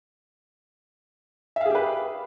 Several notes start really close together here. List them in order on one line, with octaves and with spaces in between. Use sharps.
E5 F5 G#4 G4 B4